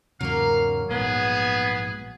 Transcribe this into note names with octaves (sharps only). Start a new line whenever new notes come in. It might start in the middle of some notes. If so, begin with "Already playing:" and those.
E2 G#2 C#3 F#3 A#3 F5
A#1 G#2 B3 G#4